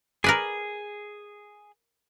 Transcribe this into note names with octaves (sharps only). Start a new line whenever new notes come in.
G#4 A#4 B4 D5